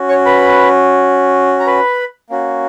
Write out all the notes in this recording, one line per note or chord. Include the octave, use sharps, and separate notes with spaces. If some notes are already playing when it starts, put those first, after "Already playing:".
Already playing: C#4 F#4
C#5 C#6
B4 B5
A#5
B4 B5
A#3 C#4 F#4